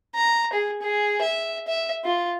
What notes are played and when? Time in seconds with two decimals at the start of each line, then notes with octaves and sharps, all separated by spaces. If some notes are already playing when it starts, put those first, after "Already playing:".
0.15 A#5
0.53 G#4
0.82 G#4
1.22 E5
1.67 E5
2.05 F4